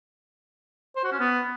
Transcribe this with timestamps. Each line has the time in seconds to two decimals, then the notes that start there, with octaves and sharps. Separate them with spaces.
0.96 C5
1.04 F#4
1.12 C#4
1.20 B3